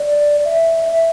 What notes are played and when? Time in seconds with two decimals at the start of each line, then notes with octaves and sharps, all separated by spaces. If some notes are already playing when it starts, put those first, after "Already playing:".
Already playing: D5
0.45 E5
0.86 E5